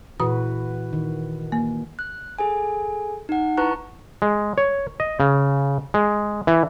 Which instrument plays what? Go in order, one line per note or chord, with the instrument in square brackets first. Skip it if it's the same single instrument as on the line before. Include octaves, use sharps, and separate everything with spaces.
[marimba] A#2 D#6 [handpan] E3 F#4 B4
[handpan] D#3
[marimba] A#3
[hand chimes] F#6
G#4 A4 G#5
D#4 F#5
E4 B4 A5 A#5 C#6 F#6
[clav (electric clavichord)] G#3
C#5
D#5
C#3
G#3
E3